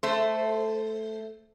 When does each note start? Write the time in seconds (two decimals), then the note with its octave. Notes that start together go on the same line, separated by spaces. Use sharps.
0.03 A3 C5